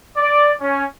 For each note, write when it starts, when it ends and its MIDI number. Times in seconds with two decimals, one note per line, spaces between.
0.17 0.51 74
0.60 0.83 61